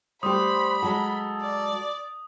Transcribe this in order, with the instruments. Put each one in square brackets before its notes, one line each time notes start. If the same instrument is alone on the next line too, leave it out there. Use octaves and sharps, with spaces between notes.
[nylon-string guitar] G3 A3 G4 [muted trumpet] C5 [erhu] B5 [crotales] D#6
[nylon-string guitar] F#3 G#3 F#4 [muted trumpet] A4
[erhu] D5